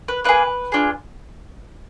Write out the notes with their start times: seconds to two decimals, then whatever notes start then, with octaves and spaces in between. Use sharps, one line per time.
0.08 B4
0.24 A#3 D#4 B4
0.29 G#4
0.72 D4 F4 G#4